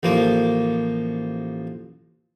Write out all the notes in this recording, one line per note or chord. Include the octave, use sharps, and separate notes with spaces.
A1 F3 A#3